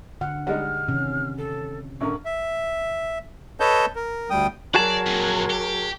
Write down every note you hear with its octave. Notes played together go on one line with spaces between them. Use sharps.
D3 F#5 F6
G3 G#3 D#4 F#5 F6
C3 D#3 C#4
A4
A1 D3 A#4 C#6
E5
A4 B4 C#5 D#5 A5 G6
A#4
D2 G3 G5 D#6
F#3 F#4 G#4 A#4 D5 A5
F2 A#2
G4